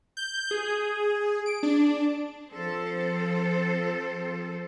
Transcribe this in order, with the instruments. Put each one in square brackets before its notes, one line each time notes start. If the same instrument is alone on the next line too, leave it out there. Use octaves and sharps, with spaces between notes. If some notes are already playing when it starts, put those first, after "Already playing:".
[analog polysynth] G6
G#4
D7
D4
[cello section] F3 C4 A4 C5